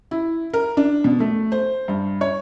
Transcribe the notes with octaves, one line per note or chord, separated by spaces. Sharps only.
E4
A#4
D4
B2
A3
C5
G2
C#5